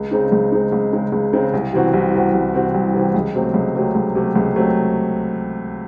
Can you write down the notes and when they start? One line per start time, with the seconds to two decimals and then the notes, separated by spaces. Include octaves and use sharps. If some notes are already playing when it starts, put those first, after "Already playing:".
Already playing: C#2
0.11 C#3 G#3 C4 D#4
0.32 C#2
0.52 C#3 G#3 C4 D#4
0.72 C#2
0.92 C#3 G#3 C4 D#4
1.12 C#2
1.33 C#3 G#3 C4 D#4
1.53 C2
1.73 C3 E3 C4 F#4
1.93 C2
2.13 C3 E3 C4 F#4
2.34 C2
2.54 C3 E3 C4 F#4
2.74 C2
2.94 C3 E3 C4 F#4
3.14 C#2
3.35 C3 F#3 A3 C4
3.54 C#2
3.75 C3 F#3 A3 C4
3.95 C#2
4.15 C3 F#3 A3 C4
4.36 C#2
4.55 C3 F#3 A3 C4